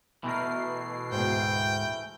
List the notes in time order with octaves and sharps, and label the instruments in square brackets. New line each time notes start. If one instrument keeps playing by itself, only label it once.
[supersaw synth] B2 C7 [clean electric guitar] E3 A3 A#4
[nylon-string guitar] D2 G#2 [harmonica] G5